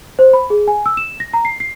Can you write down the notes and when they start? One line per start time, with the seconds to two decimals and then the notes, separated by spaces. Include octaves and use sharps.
0.19 C5
0.33 B5
0.50 G#4
0.68 G#5
0.86 E6
0.97 E7
1.20 A#6
1.34 A#5
1.45 C7
1.60 C7